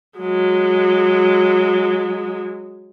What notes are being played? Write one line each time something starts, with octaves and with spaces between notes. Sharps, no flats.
F#3 G#3